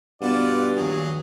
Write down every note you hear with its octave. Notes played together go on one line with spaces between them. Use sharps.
G2 B2 B3 F4 D5 F#5 A5
A#1 D#2 F#3 G#4